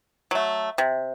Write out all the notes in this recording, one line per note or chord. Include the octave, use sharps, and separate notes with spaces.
F#3 A3
C3